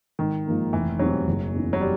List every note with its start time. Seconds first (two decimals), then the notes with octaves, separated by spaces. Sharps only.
0.19 G#1 D#3
0.46 G#2 F3 A#3 D#4
0.73 F1 E3
0.99 E2 B2 F#3 G3 C4
1.27 F#1
1.54 E2 C#3 E3
1.73 F#3
1.81 G3